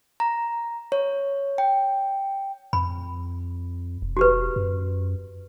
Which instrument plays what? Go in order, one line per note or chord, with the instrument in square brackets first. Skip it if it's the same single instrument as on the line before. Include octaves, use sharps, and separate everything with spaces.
[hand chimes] A#5
C#5
G5
[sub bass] F2 [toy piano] B5
[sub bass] E1
[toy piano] F#4 G4 B4
[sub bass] F#2